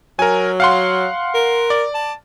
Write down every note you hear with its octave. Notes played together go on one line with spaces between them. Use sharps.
F#3 A#4 G#5
F5 F#5 C6
A#4
D5
A5